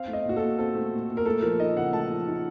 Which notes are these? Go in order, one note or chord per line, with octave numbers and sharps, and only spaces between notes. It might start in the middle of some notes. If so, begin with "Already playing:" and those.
Already playing: C4 F5
A3
D#5
A#2 F#4
A4
A#2
C4 A4
A3
A#2
A#2
A#4
A3 A4
F3 A#4
D#4 D#5
C#3 F#5
A3 A5
F3
D#4